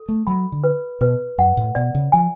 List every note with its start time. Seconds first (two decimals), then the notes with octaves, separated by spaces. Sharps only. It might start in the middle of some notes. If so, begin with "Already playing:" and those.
Already playing: A4
0.09 A3
0.27 F#3 B5
0.52 D3
0.64 B4
1.01 B2 B4
1.38 F#2 F#5
1.57 A2
1.75 B2 D5
1.95 C#3
2.12 F3 G#5